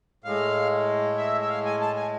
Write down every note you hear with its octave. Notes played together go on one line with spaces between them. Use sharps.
A2 G#3 F5
E5
E5
F5
G#5
A5
G#5